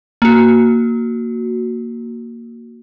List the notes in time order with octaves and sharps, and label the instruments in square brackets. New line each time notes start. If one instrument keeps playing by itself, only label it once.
[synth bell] A#3 F#4